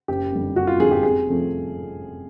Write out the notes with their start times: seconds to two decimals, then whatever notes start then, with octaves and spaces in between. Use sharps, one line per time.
0.08 F#1 G4
0.32 F2 D3 G3
0.56 F#1 F#4
0.67 F4
0.80 F2 D3 G3 G#4
0.91 G4
1.03 F2 G#4
1.27 C3 F3 A3 C4